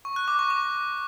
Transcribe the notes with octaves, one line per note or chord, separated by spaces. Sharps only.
C#6
F#6
D6
C#6
D6